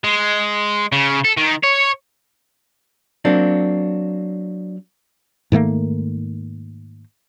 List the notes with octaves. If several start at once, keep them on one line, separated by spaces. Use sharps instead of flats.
G#3
C#3
A4
D#3
C#5
F#3 A#3 C4 D4
G#2 D#3 A3 A#3